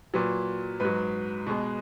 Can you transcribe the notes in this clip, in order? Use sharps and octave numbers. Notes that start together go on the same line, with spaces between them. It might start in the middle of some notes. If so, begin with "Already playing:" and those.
A#2 F#3 B4
G#2 F#3 B4
B2 G#3